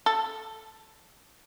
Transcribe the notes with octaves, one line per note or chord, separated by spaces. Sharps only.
A4